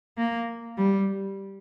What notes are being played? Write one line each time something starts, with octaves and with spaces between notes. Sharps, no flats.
A#3
G3